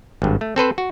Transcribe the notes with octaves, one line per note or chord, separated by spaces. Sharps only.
G#1 G2
A3
C4 A4 B4 C5
F#4